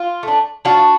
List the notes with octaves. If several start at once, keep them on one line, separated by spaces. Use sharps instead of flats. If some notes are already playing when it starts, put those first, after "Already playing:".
Already playing: F4
A3 D4
F3 D4 F#4